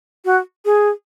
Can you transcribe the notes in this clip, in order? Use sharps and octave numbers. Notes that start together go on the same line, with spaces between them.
F#4
G#4